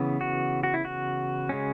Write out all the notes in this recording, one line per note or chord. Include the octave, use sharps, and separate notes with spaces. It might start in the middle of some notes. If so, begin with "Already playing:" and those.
Already playing: C#3 E3 B3
F#4
F#4
E4
F#4
C#3 G#3 C#4